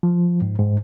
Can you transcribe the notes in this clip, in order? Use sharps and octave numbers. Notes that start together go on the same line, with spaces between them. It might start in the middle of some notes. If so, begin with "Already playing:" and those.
F3
G#2
G#2